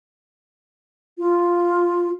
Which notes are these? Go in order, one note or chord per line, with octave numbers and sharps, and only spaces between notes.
F4